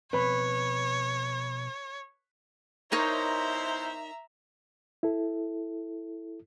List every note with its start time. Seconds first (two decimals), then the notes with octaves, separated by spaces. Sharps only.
0.13 B2 F3 C4 B4 C#5 B5
2.92 B2 D#4 E4 A#4 C5 C#5 E5 A#5
5.03 E4 A4